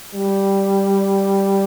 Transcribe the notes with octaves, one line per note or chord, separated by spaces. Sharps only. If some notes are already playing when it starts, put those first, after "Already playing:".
G3